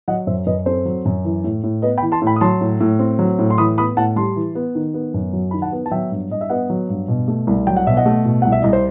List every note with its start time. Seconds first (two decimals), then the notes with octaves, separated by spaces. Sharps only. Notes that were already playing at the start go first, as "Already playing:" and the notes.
0.08 F#3 D#5 F#5
0.27 F#2 C5 E5
0.46 F#2 B4 D#5
0.66 C4 A4 C5
0.85 F#3
1.05 F#2
1.25 E3
1.44 A2
1.63 A2
1.82 B3 B4 D#5
1.98 G5 B5
2.02 E3
2.12 A5 C6
2.22 A2
2.27 G5 B5
2.36 D#6
2.41 F#3 A5 C6
2.61 A2
2.80 A2
2.99 C4
3.19 F#3
3.39 A2
3.50 C6
3.58 E3 B5 D#6
3.78 B3 B5 D#6
3.97 A2 F#5 A5
4.16 G3 A5 C6
4.36 E3
4.55 B3
4.75 D#3
4.94 B3
5.14 F#2
5.33 F#3
5.51 D#3 B5
5.62 F#5 A5
5.72 B3
5.86 A5
5.91 F#3 E5 G5
6.11 G2
6.31 G2 D#5
6.41 E5
6.50 B3 D#5 F#5
6.70 F#3
6.89 G2
7.08 B2
7.28 A3
7.47 C2
7.67 F#3 G5
7.77 F#5
7.86 B2 E5
7.97 D#5 F#5
8.06 A3
8.25 B2
8.42 C2 F#5
8.52 E5
8.62 C2 D#5
8.73 C5